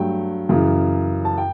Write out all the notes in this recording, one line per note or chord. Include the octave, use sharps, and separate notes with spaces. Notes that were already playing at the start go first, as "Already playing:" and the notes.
Already playing: G2 F#3 A3 G5
F#2 C#3 E3
A5
G5